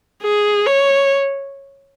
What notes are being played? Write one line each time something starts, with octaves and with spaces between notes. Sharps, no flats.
G#4
C#5